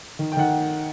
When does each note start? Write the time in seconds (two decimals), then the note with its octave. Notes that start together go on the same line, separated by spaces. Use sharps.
0.19 D#3
0.32 G5
0.37 D#3 F#5